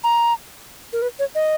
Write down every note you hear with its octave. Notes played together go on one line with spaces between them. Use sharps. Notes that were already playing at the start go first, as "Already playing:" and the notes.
A#5
A#4
B4
C#5
D#5